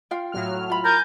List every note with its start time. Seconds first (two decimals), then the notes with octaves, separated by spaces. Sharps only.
0.11 F4 F5 G5
0.32 A2 F#3 F6
0.70 F4 B5
0.85 A#4 G#5 G6 A6